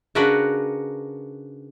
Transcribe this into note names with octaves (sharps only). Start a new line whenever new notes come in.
C#3 D4 F#4 A#4 B4